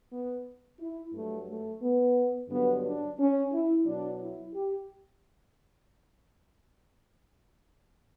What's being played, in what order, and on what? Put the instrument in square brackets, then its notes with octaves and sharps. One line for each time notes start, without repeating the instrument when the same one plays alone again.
[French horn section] B3
E4
G2 F#3 A3
A3
B3
G2 D3 F#3 B3
D4
C#4
E4
B2 F#3 D4
E4
G4